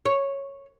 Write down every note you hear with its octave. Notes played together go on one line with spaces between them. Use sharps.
C#5